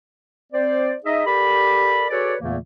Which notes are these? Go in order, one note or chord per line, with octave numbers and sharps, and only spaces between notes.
C4 C5 D5
D#4 G#4 D#5 E5
G4 A4 A#4 D5 B5
F#4 G#4 A4 B4 C#5 D5
E2 A#2 C#3 E3 A3 A#3